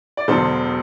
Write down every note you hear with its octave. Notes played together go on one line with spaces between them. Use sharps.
D5
E1 D2 D3 F#3 A4 C5